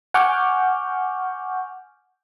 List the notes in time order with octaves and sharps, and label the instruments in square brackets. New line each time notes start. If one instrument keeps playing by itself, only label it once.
[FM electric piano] F#5 G#5 C#6 D6 F6 G6